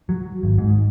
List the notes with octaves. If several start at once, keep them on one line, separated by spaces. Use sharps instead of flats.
F#3
G#1
G#2